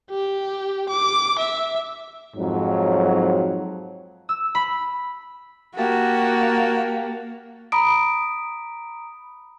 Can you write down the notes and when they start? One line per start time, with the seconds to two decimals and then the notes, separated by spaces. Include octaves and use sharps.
0.10 G4
0.89 D6
1.38 E5
2.37 F2 G#2 F#3
4.29 E6
4.55 B5
5.77 A#3 F#4 G4 A5
7.72 A#5 B5 D#6 D7